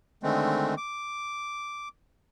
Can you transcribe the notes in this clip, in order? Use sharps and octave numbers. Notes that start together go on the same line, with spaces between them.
D3 D#3 G#3 A3 C4
D6